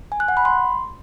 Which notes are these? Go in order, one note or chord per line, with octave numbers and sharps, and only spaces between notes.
G#5
F#6
F#5
B5
C6